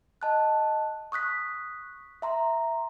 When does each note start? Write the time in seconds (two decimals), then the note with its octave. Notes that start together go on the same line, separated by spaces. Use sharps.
0.22 D#5 A5 F#6
1.12 C#6 D#6 F#6 B6
2.22 E5 A#5 C6